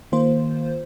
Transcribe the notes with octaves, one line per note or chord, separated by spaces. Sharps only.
D#3 A#3 F4 C5